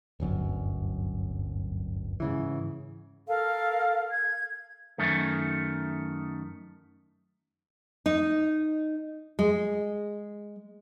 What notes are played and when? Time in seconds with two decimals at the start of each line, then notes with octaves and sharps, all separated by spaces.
0.20 D1 G1 F#2
2.20 G#2 C#3 E3
3.27 A4 A#4 F5
4.12 G#6
4.98 F#2 D#3 A3
8.06 D#4
9.39 G#3